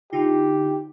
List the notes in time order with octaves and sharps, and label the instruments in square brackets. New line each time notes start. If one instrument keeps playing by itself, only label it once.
[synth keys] D3 D#4 F4 [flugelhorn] G4